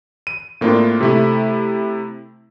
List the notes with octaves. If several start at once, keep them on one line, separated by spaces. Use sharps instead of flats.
D#7
A2 A#3 C4 D4 F4
C3 A3 E4